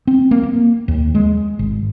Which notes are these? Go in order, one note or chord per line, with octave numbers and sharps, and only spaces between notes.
C4
A#3
A#3
D#2
G#3
G#1